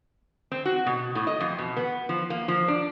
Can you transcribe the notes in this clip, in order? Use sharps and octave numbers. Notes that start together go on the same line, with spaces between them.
C4
F#4
B2
A2
D#5
F2
B2
B3
F3
A#3
F3
D4